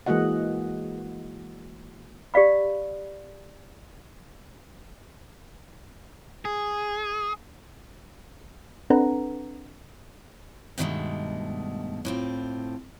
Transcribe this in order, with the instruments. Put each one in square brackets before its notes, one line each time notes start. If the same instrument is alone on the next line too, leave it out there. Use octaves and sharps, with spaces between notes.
[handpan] E3 G#3 A#3 F#4 D#5 F#5
[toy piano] G4 D5 F5 B5
[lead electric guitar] G#4
[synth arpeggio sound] C4 D4 A4 B4 F#5 A#5
[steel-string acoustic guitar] G2 B2 D#3 E3 G#3 A3
A2 C4 F4